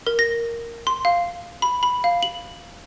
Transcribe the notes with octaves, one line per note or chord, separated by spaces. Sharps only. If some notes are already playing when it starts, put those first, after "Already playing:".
A#4
A#6
C6
F5
B5
B5
F5
F#7